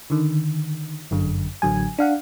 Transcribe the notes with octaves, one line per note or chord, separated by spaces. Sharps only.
D3 D#3
G1 F#2 D3
A1 D3 F#3 G#5
D4 F5 F#5